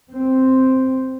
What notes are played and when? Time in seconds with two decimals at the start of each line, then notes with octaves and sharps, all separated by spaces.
0.12 C4